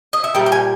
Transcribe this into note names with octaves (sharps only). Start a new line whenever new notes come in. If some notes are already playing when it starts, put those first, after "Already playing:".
D#5
E5
A#2 G3 G5
G5
G#5